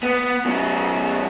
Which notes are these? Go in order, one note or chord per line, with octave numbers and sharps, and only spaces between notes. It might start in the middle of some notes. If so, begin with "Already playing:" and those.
B3
F#2 B2